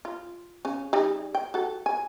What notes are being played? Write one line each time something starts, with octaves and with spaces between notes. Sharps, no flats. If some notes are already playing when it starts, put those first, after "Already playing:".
F4
C#3 C#4
G3 D#4 G#4
G5
F#4 A4
G#5